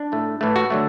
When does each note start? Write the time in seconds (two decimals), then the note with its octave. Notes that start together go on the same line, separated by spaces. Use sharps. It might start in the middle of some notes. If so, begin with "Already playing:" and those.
Already playing: D4
0.12 A2 A3
0.41 A2 E3 A3
0.56 F#4
0.70 D3 F#3 A3